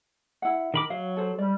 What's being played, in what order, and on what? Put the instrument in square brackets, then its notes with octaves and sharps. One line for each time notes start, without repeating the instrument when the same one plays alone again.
[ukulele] E4 F#5
[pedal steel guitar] D#3 B5 D6 [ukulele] A#4
[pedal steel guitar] F#3 [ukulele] F5
[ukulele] A4 C5
[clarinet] G3 [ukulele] D5